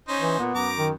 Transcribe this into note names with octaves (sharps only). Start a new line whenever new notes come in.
C#4 D#4 C5
E3
A#2 B3
F#2 A#5 D6
D#3